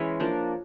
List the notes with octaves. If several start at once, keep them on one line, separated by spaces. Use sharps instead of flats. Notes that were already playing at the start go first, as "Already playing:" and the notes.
Already playing: E3 G#3 C#4 C#5 E5
F3 A#3 D4